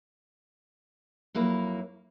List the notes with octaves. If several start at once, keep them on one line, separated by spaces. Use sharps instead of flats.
F2 F#3 A#3 E4